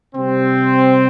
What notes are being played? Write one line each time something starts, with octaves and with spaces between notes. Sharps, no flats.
C3 G3 C4